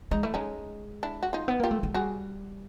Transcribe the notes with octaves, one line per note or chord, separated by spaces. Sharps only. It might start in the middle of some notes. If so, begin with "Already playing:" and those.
G#3 D#4
A3 E4
G#3 C#4 D#4
D4 E4
F#4
D#4 F4
B3
A#3 F4 G4
A3
G#3
G3 F#4 G#4